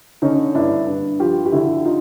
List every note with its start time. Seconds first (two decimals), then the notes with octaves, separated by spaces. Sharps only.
0.22 D3 C#4 D#4
0.55 G2 D4 E4
0.87 G2
1.20 F3 F4 G4
1.46 G4
1.52 D3 E4 F#4
1.85 D#4 F4